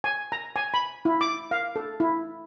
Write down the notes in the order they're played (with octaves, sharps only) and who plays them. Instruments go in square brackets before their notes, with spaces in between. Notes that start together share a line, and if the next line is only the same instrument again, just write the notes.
[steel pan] G#5
A#5
G#5
B5
E4
D6
F5
A4
E4